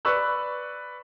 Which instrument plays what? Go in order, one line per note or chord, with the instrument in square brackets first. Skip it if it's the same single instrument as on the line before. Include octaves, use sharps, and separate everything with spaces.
[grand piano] B4 D5 B5 C#6 E6 F#6